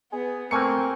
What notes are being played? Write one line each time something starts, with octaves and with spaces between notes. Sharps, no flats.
B3 G#4
A3 A#3 C4 A#4 G#5 C#6 C#7